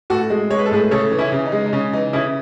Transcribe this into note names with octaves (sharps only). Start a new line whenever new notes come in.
A2 F#4 A4
G#3
G#3 C#5
B4
A4
A2 G#4 B4
C#3 A4 C#5
E3
C#4 E4
C#3
D#4
G#3
D#4
C#3 C#4
E3 D#4
C#3 C#4 E4